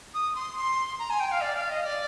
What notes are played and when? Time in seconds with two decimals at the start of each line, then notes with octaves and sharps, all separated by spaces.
0.14 D#6
0.35 C6
0.57 C6
0.99 A#5
1.10 G#5
1.20 G5
1.31 F5
1.41 D5
1.56 F5
1.70 D#5
1.84 D5